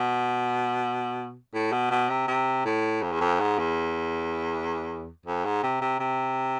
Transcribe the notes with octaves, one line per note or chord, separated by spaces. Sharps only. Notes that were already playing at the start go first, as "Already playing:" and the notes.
Already playing: B2
A2
B2
B2
C3
C3
A2
F2
E2
F2
G#2
E2
F2
G#2
C3
C3
C3